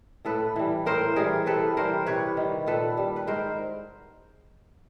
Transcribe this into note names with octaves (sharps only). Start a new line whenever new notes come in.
A2 A4 B4
E3 G3
A2 A#4 C5
E3 G3 G#4 A#4
C3 A4 B4
E3 G3 A#4 C5
C3 B4 C#5
D#3 G3
A#2 A4 B4
G3
B4
G#2 A#4 C5